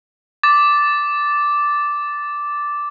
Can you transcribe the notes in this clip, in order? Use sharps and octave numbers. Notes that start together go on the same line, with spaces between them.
D6 A6